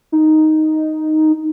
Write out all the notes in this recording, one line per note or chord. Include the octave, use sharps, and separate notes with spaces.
D#4